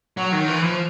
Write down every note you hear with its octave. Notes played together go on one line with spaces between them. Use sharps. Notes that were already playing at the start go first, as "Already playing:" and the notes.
F#3
D#3
E3
F3